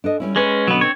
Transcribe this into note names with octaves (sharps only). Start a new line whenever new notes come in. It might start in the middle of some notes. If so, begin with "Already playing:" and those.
D4 A4 D#5
G3 C#4 E4
G#3 C#4 B4
B2 D3 F#3 B3 C#4
C4 C#5